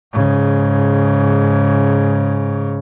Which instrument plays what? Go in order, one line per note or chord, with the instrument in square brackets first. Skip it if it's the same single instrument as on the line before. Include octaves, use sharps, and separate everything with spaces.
[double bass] G#2 C#3